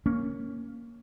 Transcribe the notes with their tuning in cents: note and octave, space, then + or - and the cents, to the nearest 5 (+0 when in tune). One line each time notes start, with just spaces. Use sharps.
A#3 +0 C#4 +0